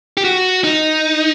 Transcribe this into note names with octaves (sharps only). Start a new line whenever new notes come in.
G4
F#4
D#4